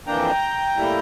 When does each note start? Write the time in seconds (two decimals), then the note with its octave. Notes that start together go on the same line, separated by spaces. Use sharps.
0.07 F2 E3 A#3 D4 G5 A#5
0.76 A2 G3 A#3 E4